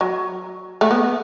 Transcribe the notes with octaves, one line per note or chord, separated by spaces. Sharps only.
F#3
A3
B3